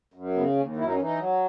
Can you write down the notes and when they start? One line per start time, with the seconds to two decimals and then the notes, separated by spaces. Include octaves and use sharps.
0.14 F#2
0.35 C#3 B3
0.56 D#2 C#4
0.76 F#2 E4
0.85 D#4
0.92 C#4
0.97 E3 D#4
1.18 F#3